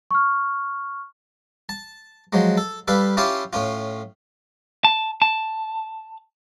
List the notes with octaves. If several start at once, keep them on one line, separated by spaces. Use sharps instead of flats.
C#6 F6
A5
F3 F#3 G#3
A4
G3 A4 B4 F5
C#4 E4 F4 G4 F5 A5
A2 C#4 F4
A5
A5